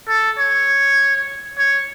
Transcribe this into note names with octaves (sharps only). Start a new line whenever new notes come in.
A4
C#5
C#5